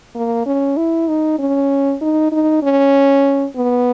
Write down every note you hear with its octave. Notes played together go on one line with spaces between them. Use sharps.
A#3
C#4
E4
D#4
C#4
D#4
D#4
C#4
B3